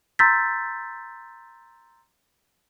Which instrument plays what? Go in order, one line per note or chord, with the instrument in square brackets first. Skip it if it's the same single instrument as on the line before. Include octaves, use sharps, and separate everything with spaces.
[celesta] A#5 C6 E6 G6 A6 B6